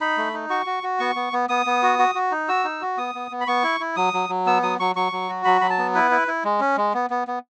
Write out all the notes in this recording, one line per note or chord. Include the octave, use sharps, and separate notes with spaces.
D#4 B5
A3
D#4
F#4 C#6
F#4
F#4
B3 C#6
B3
B3
B3 D#6
B3
F#4
F#4
F#4
D#4
F#4 E6
D#4
F#4
B3 D#6
B3
B3
B5
B3 C#6
E4
E4
F#3 D#6
F#3
F#3
B3 E6
F#3 D#6
F#3 C#6
F#3 C#6
F#3
F#4
F#3 B5
F#3 B5
A5
B3
E4 B4
E4
E4
G#3
C#4
G#3
B3
B3
B3